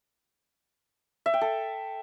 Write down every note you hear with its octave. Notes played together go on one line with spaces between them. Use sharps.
E5
G5
A4